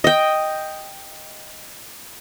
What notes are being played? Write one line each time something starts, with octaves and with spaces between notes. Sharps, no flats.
D#5 G5